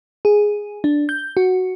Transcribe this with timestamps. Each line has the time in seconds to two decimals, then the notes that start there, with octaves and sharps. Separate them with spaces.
0.25 G#4
0.84 D4
1.09 G6
1.37 F#4